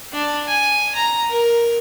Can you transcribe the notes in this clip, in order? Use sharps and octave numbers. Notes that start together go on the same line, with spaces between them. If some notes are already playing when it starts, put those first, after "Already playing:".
D4
G#5
A#5
A#4